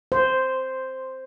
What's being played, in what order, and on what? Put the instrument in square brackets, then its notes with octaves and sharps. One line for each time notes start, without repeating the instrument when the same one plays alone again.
[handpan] C5